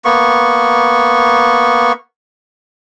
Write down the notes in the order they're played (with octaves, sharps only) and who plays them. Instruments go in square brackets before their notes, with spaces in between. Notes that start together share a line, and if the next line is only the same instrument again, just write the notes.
[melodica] A#3 B3 C#6